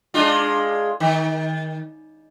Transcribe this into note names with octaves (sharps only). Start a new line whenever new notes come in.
G#3 D4 F4
D#3